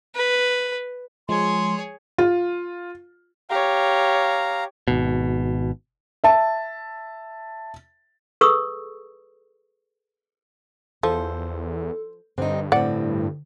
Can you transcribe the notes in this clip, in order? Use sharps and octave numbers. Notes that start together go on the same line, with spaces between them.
B4
F3 G#3 G#4 C#5 C6
F4
G4 C#5 F5 A#5
G#1 B2
E5 A5
G#4 A4 B4 C#6 D#6 E6
E2 F3 A4 C5
G2 D3 C4 D#4
A2 C4 D5 F#5